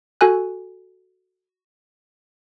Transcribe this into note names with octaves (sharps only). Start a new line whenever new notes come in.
F#4 A4 G#5 F#6